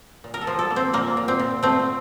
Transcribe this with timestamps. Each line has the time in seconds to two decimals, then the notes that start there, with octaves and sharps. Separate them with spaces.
0.24 A#2
0.34 A#4
0.41 A4
0.47 F3
0.59 A4
0.70 A#3
0.76 C4
0.93 A#2 A#3
1.17 A#2
1.28 C4
1.39 A#2
1.63 A3 C4